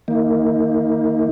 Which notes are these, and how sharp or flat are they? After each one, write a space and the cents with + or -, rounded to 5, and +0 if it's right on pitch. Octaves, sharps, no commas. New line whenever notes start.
D#3 +0 A#3 -15 D#4 +35